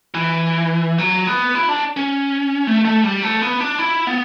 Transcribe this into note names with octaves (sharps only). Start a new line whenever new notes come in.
E3
F#3
B3
E4
D4
C#4
A3
A3
G3
A3
B3
D4
E4
B3